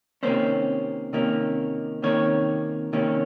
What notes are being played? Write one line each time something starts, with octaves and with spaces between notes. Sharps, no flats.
C3 D#3 A#3 C#4 C5
C3 D#3 A#3 C#4
C3 D#3 A#3 C#4 C#5
C3 D#3 A#3 C#4